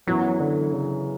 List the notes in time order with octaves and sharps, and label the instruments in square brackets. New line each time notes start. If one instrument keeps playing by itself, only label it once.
[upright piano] F#2 E3 B3 [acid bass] F#3
[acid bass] D3
C#3